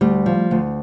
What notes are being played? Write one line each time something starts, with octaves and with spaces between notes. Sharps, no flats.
D2 G3
F3
D2